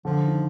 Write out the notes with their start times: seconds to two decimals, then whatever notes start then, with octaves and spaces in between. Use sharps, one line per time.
0.05 D3 F3
0.28 D#3